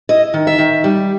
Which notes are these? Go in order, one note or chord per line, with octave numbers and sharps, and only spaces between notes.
E4 D#5
D#3
E5
D#3
G3